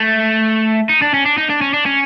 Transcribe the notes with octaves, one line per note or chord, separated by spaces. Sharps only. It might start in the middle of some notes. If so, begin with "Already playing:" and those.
Already playing: A3
D#4
D4
C#4
D4
D#4
D4
C#4
D4
C#4